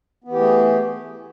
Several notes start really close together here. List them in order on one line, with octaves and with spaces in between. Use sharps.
B3 E3 G4 A3 G#4